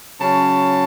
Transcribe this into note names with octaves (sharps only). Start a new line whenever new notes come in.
C#3 F#3 C#4 A5